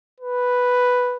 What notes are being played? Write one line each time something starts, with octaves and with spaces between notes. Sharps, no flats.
B4